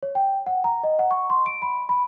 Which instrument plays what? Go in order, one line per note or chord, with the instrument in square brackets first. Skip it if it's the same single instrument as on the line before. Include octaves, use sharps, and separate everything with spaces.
[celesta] C#5
G5
F#5
A#5
D#5
F#5
C#6
C6
D7
B5
B5